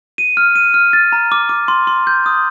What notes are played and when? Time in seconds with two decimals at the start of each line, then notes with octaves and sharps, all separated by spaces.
0.18 D#7
0.37 F6
0.55 D#7
0.74 F6
0.93 A6
1.12 A#5
1.32 D6
1.49 D6
1.68 C6
1.87 C6
2.07 G6
2.26 D#6